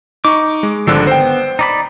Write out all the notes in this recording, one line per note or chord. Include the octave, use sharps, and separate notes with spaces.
D#4 C#6 D6
G#3
G#1 D3 F3 G3 D4 E6
B3 C5 G5
D#4 D5 B5